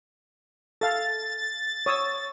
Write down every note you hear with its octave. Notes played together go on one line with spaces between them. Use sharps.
A4 F5 A6
C#5 D#6 E6